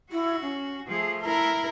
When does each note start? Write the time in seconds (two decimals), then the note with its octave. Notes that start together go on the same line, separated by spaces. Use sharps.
0.12 E4 F#4
0.42 C#4
0.87 F3 A3 G#4
1.21 E4 A#4